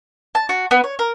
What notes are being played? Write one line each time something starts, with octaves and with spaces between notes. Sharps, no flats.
A5
F#4
B3
C#5
A#4